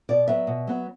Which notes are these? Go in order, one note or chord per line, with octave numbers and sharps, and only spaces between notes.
B2 D5
F#3 B3 E5
B2
F#3 B3